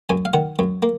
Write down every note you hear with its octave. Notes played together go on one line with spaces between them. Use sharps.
F#2 G#5
F5
D#3 F#5
F#2
A#3